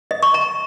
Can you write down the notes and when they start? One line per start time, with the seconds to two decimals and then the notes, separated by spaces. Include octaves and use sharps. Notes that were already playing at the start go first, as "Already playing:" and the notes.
0.11 D#5
0.23 C#6
0.34 A#5